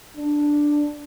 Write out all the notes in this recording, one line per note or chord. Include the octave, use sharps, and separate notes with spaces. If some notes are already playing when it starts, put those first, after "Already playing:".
D4